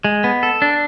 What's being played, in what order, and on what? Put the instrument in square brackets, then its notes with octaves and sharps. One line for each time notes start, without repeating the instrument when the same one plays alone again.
[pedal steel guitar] G#3
B3
A4
D4